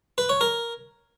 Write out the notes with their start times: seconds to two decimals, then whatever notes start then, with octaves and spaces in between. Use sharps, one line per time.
0.18 B4
0.29 C#5
0.41 A#4